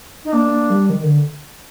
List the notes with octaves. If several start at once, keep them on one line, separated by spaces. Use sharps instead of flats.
D#4
A#3 D4
A#3
G3
D#3
D3